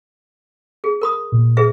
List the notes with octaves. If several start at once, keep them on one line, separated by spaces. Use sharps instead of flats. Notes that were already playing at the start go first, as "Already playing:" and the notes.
G#4
A#4 B5 D#6
A#2
G#4 B4 E5